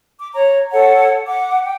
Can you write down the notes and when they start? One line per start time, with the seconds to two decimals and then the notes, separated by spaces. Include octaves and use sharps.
0.19 D6
0.34 C#5 A#5
0.71 A4 C#5 F#5
1.27 F#5 D6
1.63 G5